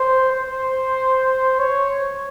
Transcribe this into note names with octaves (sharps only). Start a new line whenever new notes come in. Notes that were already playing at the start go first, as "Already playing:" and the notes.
Already playing: C5
C5
C#5